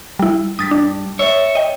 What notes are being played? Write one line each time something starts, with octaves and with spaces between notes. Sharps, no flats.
G3 E4
G2 D#6 A6 B6
D4
C#5 E5
D#5 G5